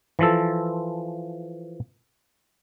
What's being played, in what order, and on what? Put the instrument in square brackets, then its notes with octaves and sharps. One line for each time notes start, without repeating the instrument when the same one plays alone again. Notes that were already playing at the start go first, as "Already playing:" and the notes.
[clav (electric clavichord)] E3 F3 A4